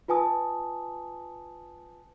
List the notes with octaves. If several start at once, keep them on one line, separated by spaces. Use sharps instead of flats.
F4 B4 G#5 A5 D#6